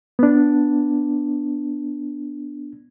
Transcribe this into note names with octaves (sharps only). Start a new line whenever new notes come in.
B3 D4